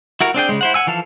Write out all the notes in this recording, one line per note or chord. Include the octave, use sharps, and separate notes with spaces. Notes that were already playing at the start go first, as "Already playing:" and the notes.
E4 F#4 A#4
C4 D4 G#4 G5
C#3 G#3
E4 C5 F#5
F#5 G#5 E6
E3 F3 A4 F5 A5